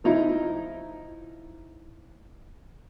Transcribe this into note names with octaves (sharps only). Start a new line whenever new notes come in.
F3 D#4 E4